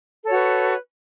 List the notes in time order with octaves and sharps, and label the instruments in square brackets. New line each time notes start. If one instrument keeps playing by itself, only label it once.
[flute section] A4
C#5
F#4
B4